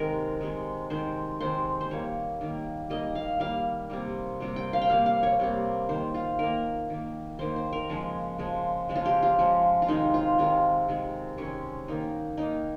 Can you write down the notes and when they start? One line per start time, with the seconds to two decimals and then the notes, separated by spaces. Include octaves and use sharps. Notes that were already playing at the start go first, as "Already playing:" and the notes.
Already playing: C3 D#3 G#3 A#4
0.41 C3 D#3 G#3
0.90 C3 D#3 G#3 C5
1.41 C3 D#3 G#3 C5
1.81 C5
1.90 D#3 G3 A#3 C#5
2.41 D#3 G3 A#3
2.90 D#3 G3 A#3 D#5
3.15 F5
3.40 D#3 G3 A#3 F5
3.90 C3 G3 A#3
4.40 C3 G3 A#3
4.56 G5
4.73 F5
4.81 G5
4.90 C3 G3 A#3 F5
5.06 F5
5.23 C#5
5.40 C3 G3 A#3
5.89 D#3 A#3 C5
6.14 F4
6.39 D#3 A#3 A#4
6.90 D#3 A#3
7.39 D#3 A#3 C5
7.56 C5
7.73 A#4
7.89 C#3 F3 G#3
8.38 C#3 F3 G#3
8.89 C#3 F3 G#3
8.95 F4
9.05 G4
9.22 F4
9.39 C#3 F3 G#3
9.82 F4
9.88 C3 D#3 G#3 D#4
10.14 F4
10.38 C3 D#3 G#3 F4
10.88 C3 D#3 G#3
11.38 C3 D#3 G#3 C#4
11.88 D#3 A#3 D#4
12.37 D#3 A#3 D#4